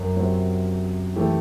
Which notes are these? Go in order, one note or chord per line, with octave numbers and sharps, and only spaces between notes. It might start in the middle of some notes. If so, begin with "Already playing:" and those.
Already playing: F#2
C3 F#3 C4
E3 A3 E4 G4